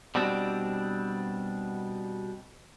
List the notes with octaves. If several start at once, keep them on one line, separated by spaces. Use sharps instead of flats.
B2 G3 C4 D4